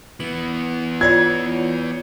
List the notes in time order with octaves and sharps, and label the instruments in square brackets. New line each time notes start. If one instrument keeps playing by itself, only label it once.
[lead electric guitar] E3 B3 [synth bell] F#7
[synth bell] F4 C#5 D5 [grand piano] G#6